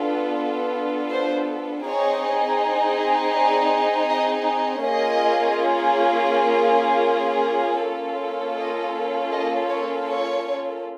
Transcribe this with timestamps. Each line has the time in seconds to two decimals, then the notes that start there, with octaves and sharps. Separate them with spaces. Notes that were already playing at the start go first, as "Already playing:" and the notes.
Already playing: B3 D4 F4 A4
1.10 C5
1.85 C4 D#4 G#4 C#5
3.34 D5
4.09 D#5
4.83 A#3 C#4 F4 G#4 D#5
7.83 A#3 C#4 F4 A4
8.58 D#5
9.32 D#5
9.70 C#5
10.08 C#5